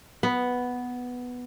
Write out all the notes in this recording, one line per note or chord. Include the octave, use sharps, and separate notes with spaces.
B3